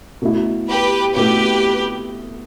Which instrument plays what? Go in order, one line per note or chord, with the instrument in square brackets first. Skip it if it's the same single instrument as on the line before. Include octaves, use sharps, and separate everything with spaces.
[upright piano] B2 A3 E4
[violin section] G4 B4
[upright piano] B2 A3 E4 [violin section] G4 B4